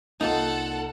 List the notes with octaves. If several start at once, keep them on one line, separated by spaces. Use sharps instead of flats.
C2 A#3 D#4 F4 A4 D5 F#5